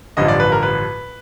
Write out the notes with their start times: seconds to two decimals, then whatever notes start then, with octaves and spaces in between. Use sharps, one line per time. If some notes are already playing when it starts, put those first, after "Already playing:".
0.17 A1 G2 D3 F3 D#5
0.28 D5
0.40 B4
0.52 A#4
0.63 B4